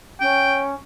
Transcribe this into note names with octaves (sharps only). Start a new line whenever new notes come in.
C#4 G5